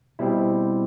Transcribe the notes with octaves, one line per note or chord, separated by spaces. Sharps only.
B2 G3 C4 E4